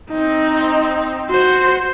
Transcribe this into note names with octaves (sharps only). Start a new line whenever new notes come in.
C4 D#4
F#4 C5